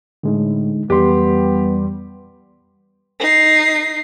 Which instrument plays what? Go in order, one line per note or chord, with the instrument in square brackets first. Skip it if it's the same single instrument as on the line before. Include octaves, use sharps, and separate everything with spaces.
[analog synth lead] A2 [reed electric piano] D3 G#3 D#4
[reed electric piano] F2 E3 C6 [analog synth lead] G3 [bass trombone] B3 [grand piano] G4
[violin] D#4 C7